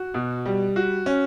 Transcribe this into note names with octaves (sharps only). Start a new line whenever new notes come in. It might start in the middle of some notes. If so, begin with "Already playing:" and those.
Already playing: F#4
B2
G3
F#4
C#4